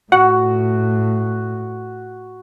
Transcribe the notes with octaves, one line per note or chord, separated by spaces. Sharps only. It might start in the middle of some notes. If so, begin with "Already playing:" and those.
A2 F#4 F#5